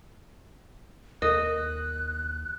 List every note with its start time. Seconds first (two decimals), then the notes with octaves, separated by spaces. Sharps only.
1.22 D#2 A#4 D#5 F#6